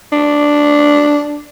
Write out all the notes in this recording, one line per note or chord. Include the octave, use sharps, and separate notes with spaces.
D4